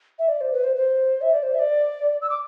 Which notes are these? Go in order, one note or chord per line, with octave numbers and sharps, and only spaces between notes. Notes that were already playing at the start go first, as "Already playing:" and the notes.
E5
D5
C5
B4
C5
C5
E5
D5
C5
E5
D5
E6
D6